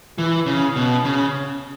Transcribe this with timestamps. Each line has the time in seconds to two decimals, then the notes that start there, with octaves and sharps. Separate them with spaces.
0.18 E3
0.46 C#3
0.76 B2
1.05 C#3